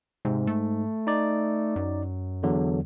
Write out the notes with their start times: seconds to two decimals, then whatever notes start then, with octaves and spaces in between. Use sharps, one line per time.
0.25 G#2 C3
0.47 A3
1.07 D#4 D5
1.76 F#2
2.43 E2 D3 F#3